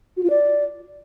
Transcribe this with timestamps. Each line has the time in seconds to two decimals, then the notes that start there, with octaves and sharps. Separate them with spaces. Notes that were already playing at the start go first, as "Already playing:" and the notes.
0.17 F#4
0.23 F4
0.30 D5